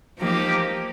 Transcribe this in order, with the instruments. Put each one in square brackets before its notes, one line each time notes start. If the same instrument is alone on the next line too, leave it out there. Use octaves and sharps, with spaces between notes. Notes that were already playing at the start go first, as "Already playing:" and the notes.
[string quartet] F3 A#3 D#4 G4